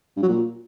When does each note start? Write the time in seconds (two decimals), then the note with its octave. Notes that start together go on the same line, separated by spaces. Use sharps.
0.16 G2
0.22 F#3
0.28 A#2